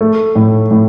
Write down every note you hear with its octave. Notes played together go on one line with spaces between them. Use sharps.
A3
A2
A2